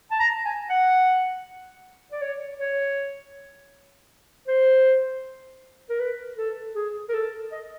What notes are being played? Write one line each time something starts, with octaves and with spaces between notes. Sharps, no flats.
A5
A#5
G#5
F#5
D5
C#5
C#5
C5
A#4
B4
A4
G#4
A#4
A4
D#5